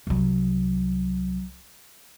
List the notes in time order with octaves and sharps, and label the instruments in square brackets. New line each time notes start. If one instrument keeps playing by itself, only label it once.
[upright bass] C2 F#3